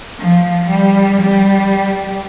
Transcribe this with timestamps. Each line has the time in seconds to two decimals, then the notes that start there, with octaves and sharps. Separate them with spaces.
0.19 F3
0.68 G3
1.20 G3